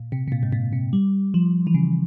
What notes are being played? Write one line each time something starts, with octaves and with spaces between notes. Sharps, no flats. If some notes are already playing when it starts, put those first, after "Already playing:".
Already playing: A#2
C3
C3
A#2
G#2
A#2
C3
G3
F3
E3
C#3